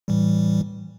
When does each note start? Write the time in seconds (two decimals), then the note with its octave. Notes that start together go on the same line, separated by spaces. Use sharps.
0.08 A2 E3 G3